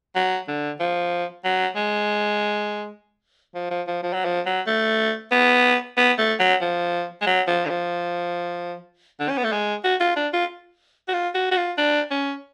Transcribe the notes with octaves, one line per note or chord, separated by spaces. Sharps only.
F#3
D3
F3
F#3
G#3
F3
F3
F3
F3
F#3
F3
F#3
A3
B3
B3
A3
F#3
F3
G#3
F#3
F3
D3
F3
D3
C#4
B3
A3
G#3
F#4
F4
D4
F4
F#4
F4
F#4
F#4
F4
D4
C#4